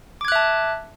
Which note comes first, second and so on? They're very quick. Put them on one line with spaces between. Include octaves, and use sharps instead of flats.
D6 G#6 F#6 E5 A5